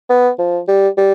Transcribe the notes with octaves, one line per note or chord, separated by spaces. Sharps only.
B3
F3
G3
G3